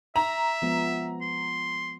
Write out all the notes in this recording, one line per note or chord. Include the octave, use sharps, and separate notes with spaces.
E5 A#5
F3 G#3 B3
C6